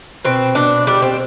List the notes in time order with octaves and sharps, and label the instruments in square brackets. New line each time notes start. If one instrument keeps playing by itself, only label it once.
[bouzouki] B2 C4
B2 D4
G3 D4
C4